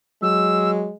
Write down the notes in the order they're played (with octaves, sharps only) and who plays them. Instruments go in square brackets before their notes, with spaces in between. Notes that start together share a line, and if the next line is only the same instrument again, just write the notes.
[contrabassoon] F#3 [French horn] G#3 [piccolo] E6